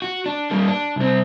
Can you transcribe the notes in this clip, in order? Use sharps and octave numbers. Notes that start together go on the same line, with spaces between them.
F#4
D4
G3 A#3
D4
C2 C4